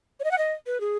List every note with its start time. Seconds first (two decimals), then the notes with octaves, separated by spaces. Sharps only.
0.20 C#5
0.24 D#5
0.31 F#5
0.38 D#5
0.66 B4
0.80 G#4